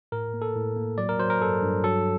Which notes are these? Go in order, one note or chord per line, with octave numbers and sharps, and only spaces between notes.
A2 A#4
A#3
A4
A2
A#3
F#3 D5
A#4
F#3 C5
A#4
G2 A4
G2
F#3 A4